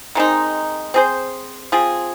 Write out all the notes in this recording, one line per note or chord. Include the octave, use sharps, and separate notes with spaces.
D#3 G#3 C4 D#4
C4 G#4 C5
F3 C4 G#4